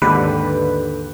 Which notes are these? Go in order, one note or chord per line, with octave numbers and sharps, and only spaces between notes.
D#2 G#2 D3 G4 B4